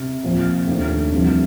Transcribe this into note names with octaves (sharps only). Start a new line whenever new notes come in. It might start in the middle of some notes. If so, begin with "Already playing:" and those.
Already playing: C3
A#2 F3 C4 F4
D#2 D#3 A3 D4
C2 C3 F3